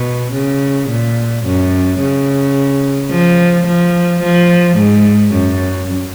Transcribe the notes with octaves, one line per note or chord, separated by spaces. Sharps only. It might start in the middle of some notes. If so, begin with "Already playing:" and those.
Already playing: B2
C#3
A#2
F#2
C#3
F3
F3
F3
G#2
F#2